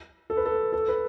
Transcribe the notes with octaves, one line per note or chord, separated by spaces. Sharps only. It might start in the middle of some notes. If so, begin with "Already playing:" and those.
A4
B4
A4
A4
B4